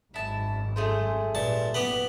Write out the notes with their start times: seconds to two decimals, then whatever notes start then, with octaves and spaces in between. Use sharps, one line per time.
0.14 G#1 F#2 E4 A5
0.76 A3 G#4 C5
1.35 G2 A#2 A5
1.74 F#1 A#2 B3 G4 B4